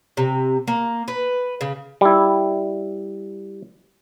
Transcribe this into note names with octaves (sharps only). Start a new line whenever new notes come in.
C3
A#3
B4
C#3
G3 E4